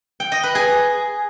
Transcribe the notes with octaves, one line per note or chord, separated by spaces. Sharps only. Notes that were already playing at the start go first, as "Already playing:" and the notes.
G5
D#5
B4
G#4